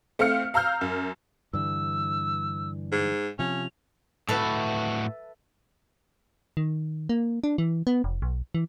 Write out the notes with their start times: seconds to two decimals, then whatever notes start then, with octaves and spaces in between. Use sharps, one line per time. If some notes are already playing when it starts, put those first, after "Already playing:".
0.19 A3 C4 F5 F6 C#7
0.54 F5 A#5 E6 F6 G6
0.81 F#2
1.53 G2 D3 E3 E6
2.92 G#2
3.39 C3 F3 C#4 F7
4.29 A2 F#4 A4 B4 E5
6.57 D#3
7.09 A#3
7.44 D4
7.58 E3
7.87 B3
8.04 F1
8.22 B1
8.55 E3